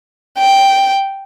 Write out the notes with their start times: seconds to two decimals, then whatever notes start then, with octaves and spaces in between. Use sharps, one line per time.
0.38 G5